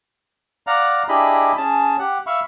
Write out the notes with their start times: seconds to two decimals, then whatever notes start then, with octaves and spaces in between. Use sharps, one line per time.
0.67 D5 F5 F#5 A#5
1.08 D4 E4 G4 G#4 D#5 B5
1.57 C#4 G#4 A5
1.99 G4 F#5
2.26 E5 F5 B5 C#6